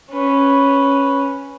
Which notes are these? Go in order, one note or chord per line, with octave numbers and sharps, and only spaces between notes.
C#4 B4